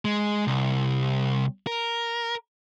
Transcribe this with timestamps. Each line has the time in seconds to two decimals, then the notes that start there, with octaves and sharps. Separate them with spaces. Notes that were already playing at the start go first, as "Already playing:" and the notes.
0.05 G#3
0.47 C2
1.67 A#4